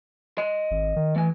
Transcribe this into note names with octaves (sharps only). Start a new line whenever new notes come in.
D#5 C6
G#1
D#3
E3 A3 G#5